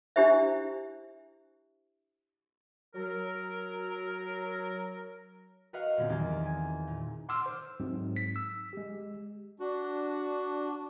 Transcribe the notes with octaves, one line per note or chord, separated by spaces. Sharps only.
D4 E4 G4 C5 E5
F#3 A#4
F#4 A#4 B4 D#5 F5 F#5
F#2 A#2 D3 B3 C4
E2 D#3 D#4 G4 G#4 G#5
G#5
A#2
F#5 C6 D6 E6 F6
C5
G#2 F#3 C4
B6
E6
G#3 G4
D4 F#4